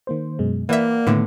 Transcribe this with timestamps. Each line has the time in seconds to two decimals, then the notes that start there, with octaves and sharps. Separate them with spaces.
0.07 D#3 A#3 C5
0.39 F#2 B2 G#3
0.69 E3 A#3 D5 E5 F#5
1.07 A2 D3 D#3 A3 B3